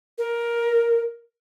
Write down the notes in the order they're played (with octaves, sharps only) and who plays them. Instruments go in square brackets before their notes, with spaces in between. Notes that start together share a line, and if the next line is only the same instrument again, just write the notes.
[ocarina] A#4